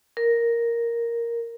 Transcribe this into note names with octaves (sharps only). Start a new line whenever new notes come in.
A#4